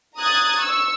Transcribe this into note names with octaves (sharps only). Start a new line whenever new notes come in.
A#5 D#6 F#6 G#6 A6
C#6 E6